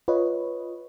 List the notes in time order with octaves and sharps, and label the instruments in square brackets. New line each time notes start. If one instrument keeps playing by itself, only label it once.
[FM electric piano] F4 B4 C#5 D#5